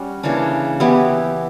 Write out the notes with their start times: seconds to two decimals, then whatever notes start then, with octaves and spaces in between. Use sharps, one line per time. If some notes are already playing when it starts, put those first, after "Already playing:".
Already playing: G3 C#4 F#4
0.23 C#3 E3 A#3 D4
0.80 E3 B3 E4 G4